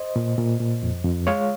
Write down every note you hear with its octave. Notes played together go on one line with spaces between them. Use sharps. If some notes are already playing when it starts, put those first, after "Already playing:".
Already playing: C5 D#5
A#2
A#2
A#2
F2
F2
G#3 C#5 F5